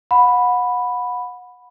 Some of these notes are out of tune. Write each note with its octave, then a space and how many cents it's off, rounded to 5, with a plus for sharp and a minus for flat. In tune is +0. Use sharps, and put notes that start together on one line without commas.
F#5 -30 B5 +0